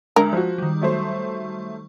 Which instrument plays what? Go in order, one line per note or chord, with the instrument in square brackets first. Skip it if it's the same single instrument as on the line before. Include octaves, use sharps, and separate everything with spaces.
[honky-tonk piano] D2 [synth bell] G#3 [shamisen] A#4
[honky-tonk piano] F3 F#4
[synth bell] D#3 G3
[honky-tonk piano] F#3 A3 C5